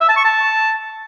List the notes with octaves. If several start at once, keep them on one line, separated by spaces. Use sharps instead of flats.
E5
A5
C#6
A5